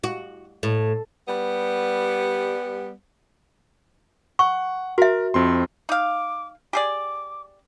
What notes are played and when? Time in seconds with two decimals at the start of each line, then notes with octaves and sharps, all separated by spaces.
0.04 F#4
0.63 A2
1.28 G3 B3
4.39 F#5 C#6
4.98 F#4 A#4 E5
5.34 F2 C4 C6
5.89 D#4 F5 D6
6.73 G4 G#4 D5 D6